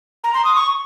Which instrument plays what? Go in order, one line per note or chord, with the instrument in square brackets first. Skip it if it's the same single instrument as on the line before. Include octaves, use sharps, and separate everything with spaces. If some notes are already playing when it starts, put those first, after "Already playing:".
[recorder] A#5
C6
D#6
C#6